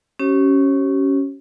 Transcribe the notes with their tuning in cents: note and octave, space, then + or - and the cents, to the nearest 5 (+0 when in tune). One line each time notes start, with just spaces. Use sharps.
C#4 +0 G4 -45 C#5 -45